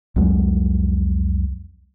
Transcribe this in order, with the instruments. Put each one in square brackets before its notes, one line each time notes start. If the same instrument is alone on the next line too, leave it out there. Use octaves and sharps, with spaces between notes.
[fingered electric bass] C2 F2 F#3 G#3